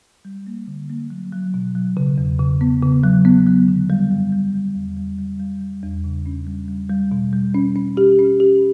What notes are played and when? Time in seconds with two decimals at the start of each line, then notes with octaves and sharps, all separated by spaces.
0.25 G3
0.47 A#3
0.68 D3
0.90 A#3
1.10 F#3
1.33 F#3
1.54 B2
1.75 F#3
1.97 C#3
2.18 E2
2.39 C#3
2.61 B3
2.83 C#3
3.04 F#3
3.25 B3
3.47 F#3
3.68 D3
3.90 G3
4.11 F#2
4.32 G3
4.54 G3
4.76 E2
4.97 G3
5.19 G3
5.40 G3
5.61 G3
5.83 E2
6.04 C#3
6.26 C#4
6.47 G3
6.68 G3
6.90 G3
7.12 B2
7.33 G3
7.55 C#4
7.76 C#4
7.97 G4
8.19 C#4
8.40 G4